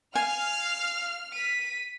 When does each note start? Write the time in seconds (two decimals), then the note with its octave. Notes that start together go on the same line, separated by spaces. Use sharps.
0.15 F5 G#5 F6
1.33 B6 D#7